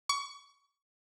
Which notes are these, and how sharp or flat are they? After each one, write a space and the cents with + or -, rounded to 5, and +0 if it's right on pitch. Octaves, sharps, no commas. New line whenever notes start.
C#6 +25